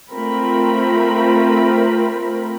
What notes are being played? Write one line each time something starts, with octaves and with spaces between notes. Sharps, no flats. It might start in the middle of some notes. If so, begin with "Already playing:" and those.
A3 C4 F4 A#4 B5